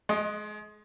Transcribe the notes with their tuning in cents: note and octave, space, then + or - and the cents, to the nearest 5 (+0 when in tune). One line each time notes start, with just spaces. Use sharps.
G#3 +30 D#5 +0 C6 +35